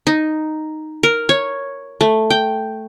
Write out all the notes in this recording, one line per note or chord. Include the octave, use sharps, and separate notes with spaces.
D#4
A#4
C#5
A3
G5